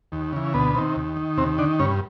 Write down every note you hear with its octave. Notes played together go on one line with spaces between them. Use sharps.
D#2
C#3 E3
D2 B2 B3
C3 D#3
D#2
D#3
D#2 C3 C4
D3 D#3 D4
G2 C#3 C#4